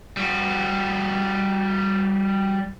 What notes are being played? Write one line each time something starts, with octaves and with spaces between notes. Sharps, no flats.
G3 F#4